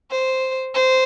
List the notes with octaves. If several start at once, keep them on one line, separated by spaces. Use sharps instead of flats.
C5
C5